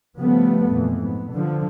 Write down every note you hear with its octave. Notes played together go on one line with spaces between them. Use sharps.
C#3 F3 G3 A3 B3
F2 A#2 E3
G#2 B3
D3 F3